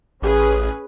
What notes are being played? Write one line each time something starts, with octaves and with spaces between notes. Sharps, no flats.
A1 C#4 G#4 B4